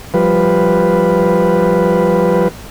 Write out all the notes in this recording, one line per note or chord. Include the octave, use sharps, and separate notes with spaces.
F3 G3 B4